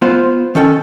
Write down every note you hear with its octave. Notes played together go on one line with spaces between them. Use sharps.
B3 F4 C5
D#3 C#4 A4 G5